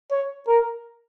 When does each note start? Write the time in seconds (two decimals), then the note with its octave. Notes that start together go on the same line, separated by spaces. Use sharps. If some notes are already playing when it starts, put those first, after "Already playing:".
0.11 C#5
0.48 A#4